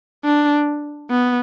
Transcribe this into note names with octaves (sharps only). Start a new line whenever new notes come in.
D4
B3